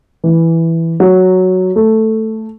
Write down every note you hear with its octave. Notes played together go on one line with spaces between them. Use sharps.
E3
F#3
A3